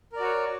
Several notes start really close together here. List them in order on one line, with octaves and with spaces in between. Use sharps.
A#4 D5 F#4 C#5